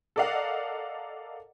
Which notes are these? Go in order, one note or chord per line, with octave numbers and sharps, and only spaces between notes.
A4 A#4 D5 D#5 F5 F#5